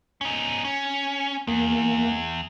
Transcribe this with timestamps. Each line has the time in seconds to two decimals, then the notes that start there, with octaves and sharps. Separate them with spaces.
0.21 C#4 D#4
0.65 C#4
1.47 E2 A#3